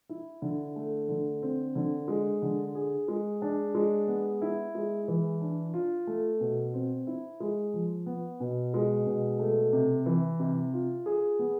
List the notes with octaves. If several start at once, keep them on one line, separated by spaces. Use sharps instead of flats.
E4
D3
A3
D3
C4
D3
G#3
D3
G#4
G#3
D4
G#3
B3
E4
G#3
E3
D4
F4
A3
B2
C4
E4
G#3
F3
B3
B2
G#3
B2
A3
C3
E3
C3
F4
G#4
B3